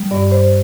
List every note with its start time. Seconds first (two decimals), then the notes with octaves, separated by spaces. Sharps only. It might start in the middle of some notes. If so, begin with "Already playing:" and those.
Already playing: G3
0.11 G2 D5
0.31 C5